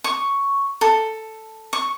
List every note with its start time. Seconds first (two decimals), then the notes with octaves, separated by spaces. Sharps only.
0.04 C#6
0.81 A4
1.73 C#6